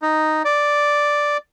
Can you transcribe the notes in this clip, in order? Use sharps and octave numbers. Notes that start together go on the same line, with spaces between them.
D#4
D5